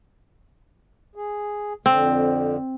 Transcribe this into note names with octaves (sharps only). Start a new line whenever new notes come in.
G#4
F2 D3 C4